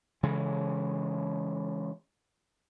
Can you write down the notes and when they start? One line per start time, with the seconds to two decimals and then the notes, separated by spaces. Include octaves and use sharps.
0.23 C#3 E3 G#3